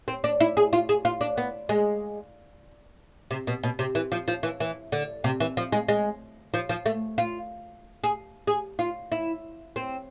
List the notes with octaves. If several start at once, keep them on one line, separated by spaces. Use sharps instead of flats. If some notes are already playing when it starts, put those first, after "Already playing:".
C4
D4
E4
G#4
F4
G#4
F4
D4
B3
G#3
C3
B2
B2
C3
E3
F3
F3
E3
E3
D3
C3
E3
F3
G#3
G#3
F3
F3
A3
F4
G#4
G#4
F4
E4
C4